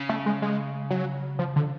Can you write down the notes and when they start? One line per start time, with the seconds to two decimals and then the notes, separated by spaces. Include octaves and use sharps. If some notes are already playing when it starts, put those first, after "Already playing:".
Already playing: C#3
0.09 A3
0.26 G#3
0.42 G#3
0.90 F#3
1.39 F3
1.56 D3